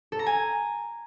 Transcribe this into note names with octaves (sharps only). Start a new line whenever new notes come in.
A4
A#5
G#5